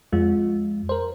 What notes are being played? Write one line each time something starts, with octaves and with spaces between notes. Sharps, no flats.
F2 G#3 F4
A#4 C5